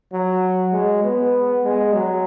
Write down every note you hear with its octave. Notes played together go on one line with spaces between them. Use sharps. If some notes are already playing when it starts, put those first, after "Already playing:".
F#3
G#3
B3
G#3
F#3